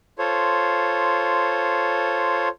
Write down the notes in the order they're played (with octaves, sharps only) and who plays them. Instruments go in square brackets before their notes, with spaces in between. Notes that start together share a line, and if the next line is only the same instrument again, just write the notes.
[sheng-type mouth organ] F4 A4 C5 C#5